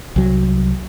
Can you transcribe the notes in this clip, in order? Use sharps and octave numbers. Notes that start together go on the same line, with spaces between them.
C2 F#3